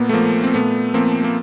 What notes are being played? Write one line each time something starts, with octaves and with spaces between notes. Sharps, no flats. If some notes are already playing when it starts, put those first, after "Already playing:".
Already playing: A#2 A#3 B3
A3
F3 A#3
C4
A#2 A3 B3
F3 A#3 C4
A#3